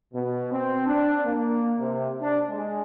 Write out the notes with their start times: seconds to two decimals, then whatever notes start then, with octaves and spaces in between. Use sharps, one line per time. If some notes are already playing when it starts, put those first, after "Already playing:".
0.14 B2
0.52 C4
0.86 D4
1.25 A#3
1.79 C3
2.20 D4
2.49 G#3